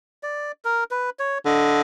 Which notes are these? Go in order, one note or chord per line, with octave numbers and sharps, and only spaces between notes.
D5
A#4
B4
C#5
D3 D#5